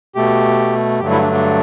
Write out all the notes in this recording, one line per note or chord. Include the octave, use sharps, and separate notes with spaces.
B2 A3 G4
G2 D3 F#3 A3 G4
E4
D4
D4